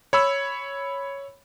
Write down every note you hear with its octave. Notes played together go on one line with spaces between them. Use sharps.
C#5 B5 E6